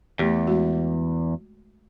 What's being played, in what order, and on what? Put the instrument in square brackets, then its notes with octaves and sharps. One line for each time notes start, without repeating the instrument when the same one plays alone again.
[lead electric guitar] E2 [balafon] A3 G4
[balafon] G#3 F#4